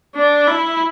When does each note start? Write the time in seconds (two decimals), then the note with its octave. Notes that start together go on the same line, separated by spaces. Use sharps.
0.15 D4
0.47 E4